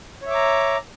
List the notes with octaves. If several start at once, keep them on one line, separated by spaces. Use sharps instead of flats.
C#5 E5 A#5 D6